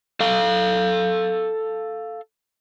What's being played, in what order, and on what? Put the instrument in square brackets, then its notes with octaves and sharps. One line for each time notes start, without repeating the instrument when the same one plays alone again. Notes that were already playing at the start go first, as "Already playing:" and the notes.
[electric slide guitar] A4 F5